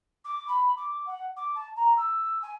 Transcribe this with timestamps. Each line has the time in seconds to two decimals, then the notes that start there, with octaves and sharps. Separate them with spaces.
0.24 D6
0.47 B5
0.76 D6
1.06 F#5
1.36 D6
1.55 A5
1.76 A#5
1.96 E6
2.42 G#5